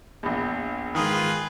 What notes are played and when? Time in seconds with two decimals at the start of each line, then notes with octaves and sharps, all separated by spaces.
0.23 A#1 E2
0.95 G#2 D#3 F4 G#4 B4